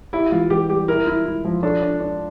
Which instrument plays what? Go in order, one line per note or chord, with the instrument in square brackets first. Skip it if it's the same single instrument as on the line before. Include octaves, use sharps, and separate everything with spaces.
[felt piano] E4 [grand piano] G4
[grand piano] E3 [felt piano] F4
[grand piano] E3 [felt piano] G4
[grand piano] G3 [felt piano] G4
[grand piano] E4 [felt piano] A#4
[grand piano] E4
E4
F3
[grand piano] D4 [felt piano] A4
[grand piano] D4
D4